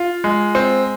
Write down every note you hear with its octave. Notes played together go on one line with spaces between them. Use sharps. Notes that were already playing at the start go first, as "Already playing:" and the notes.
Already playing: F4
G#3
C4